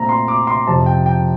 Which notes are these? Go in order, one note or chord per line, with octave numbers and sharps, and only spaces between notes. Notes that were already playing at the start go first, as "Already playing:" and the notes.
Already playing: A#2 A3 C4 A#5
C6
D6
C6
F2 C3 F3 C4 A5
G5
G5